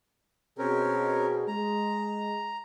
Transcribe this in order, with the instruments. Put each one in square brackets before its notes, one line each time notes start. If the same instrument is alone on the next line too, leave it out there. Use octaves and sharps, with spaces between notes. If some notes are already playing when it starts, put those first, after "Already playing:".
[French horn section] B2 G#4 [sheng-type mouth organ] C4 C#4 A#4
[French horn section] G#3 [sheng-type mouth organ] A#5